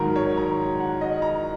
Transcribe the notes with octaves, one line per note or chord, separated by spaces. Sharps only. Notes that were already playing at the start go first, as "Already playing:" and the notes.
Already playing: G#2 D#3 F#3 A#4
C#5
A#5
F#5
D#5
A#5